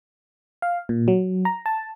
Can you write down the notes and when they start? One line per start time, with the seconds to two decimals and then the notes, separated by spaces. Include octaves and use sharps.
0.62 F5
0.89 A#2
1.08 F#3
1.45 A#5
1.66 A5